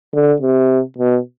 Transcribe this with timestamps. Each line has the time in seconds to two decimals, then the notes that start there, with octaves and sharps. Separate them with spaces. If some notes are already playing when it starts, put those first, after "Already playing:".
0.14 D3
0.42 C3
0.98 B2